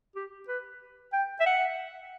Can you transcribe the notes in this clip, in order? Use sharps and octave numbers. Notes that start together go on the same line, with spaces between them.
G4
B4
G5
E5
F#5